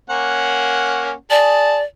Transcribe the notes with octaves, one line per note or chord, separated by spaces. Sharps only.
A#3 C#4 F#5
G#4 D5 A5